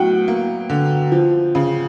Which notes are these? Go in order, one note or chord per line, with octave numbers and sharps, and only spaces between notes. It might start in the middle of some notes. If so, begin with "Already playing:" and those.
Already playing: A2 F#3 B3 F#5 G5
A#3
D3
F3
C#3